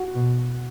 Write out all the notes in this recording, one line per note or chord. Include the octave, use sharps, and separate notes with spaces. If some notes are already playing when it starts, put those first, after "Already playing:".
Already playing: F#4
B2